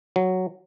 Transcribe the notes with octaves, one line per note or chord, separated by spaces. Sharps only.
F#3